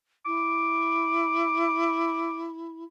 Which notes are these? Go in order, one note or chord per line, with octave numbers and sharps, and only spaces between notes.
E4 D6